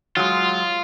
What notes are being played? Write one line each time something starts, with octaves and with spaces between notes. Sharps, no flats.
F#3 G#3 F4